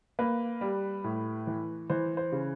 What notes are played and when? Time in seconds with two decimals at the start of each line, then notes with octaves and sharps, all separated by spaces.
0.19 A#3 B4
0.61 G3
1.04 A2
1.47 E3
1.90 E3 C5
2.17 C5
2.32 C#3